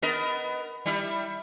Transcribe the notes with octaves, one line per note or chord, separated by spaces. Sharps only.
B3 A#4 D#5
G3 E4